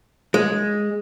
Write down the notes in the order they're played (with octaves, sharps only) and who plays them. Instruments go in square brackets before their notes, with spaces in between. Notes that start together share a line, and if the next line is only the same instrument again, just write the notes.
[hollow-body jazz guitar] G#3